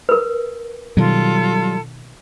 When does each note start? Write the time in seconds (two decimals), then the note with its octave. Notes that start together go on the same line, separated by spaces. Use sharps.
0.09 A#4 B4
0.97 B2 D#3 F#3 G3 F4 A4